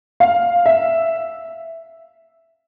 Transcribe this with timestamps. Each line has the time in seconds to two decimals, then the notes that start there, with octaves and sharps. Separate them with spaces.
0.20 F5
0.66 E5